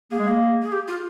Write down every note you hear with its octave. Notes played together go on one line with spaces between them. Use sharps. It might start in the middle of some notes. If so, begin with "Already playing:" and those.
A#3 G#4
G#3
A#3
G#4
G4
F4